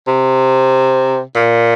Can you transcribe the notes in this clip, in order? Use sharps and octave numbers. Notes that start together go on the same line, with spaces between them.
C3
A#2